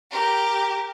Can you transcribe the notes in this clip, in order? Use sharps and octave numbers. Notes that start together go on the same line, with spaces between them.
G4 A#4